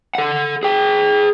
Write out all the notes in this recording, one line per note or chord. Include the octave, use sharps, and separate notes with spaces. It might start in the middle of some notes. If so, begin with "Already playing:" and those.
A4 F#5
G#4 G5